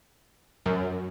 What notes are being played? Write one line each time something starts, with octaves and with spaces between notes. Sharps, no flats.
F#2